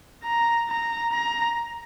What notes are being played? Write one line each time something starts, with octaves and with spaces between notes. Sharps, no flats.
A#5
A#5
A#5